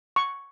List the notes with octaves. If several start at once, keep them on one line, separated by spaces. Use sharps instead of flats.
C#6